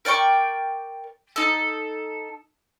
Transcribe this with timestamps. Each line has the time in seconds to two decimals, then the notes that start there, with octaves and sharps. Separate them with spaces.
0.05 A#4 D5 G5 C#6
1.36 D#4 A4